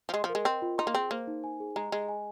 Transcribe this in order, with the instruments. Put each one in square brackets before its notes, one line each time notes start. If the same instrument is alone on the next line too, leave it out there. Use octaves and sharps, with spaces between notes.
[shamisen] F3
[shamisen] G#3 [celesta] C6
[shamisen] F3
[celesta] A#4
[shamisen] G#3
[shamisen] C4 [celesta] D#5
[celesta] F4
[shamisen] D#4 [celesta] C6
[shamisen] A#3
[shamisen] C4 [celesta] G#4
[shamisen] A#3 [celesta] C5
[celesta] D#4
G#5
G#4
[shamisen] G#3 [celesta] A#5
[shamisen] G#3 [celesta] G#4
[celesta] G#5